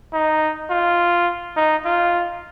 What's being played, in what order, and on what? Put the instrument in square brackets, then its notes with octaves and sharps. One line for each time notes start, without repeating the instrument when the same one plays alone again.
[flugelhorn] D#4
F4
D#4
F4